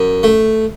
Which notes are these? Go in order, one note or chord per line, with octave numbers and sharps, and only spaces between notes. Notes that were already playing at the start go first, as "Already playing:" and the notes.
Already playing: F#2
A3